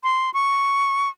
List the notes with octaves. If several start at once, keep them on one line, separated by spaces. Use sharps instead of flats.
C6
C#6